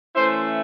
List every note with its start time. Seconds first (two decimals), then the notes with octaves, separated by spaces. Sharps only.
0.15 E3 A3 C#4 E4 C5